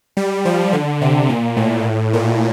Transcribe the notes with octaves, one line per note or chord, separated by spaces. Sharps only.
G3
F3
D3
C3
A#2
A2
A#2